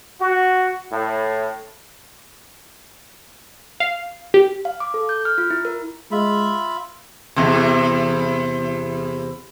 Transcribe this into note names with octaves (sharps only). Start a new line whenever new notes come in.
F#4
A2
F5
G4
F5
D6
A4
G6
F6
F4
E4
A#4
G#3 F4 E5 B5
E2 C3